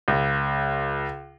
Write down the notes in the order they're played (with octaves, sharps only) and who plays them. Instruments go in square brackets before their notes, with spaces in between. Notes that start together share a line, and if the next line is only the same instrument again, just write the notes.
[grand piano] C#2